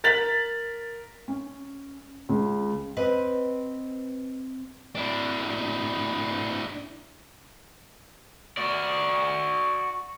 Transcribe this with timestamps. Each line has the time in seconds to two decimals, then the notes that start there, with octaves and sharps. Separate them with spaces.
0.04 A#4 A6 B6 F#7
1.28 C#4
2.29 C#2
2.96 C4 B4 D#5
4.95 D4 E4
8.57 F#4 D5